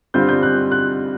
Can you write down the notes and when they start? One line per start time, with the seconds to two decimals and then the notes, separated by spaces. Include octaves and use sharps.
0.14 G2 D3 G3 C4 F4 G6
0.29 G6
0.43 F#6
0.71 F#6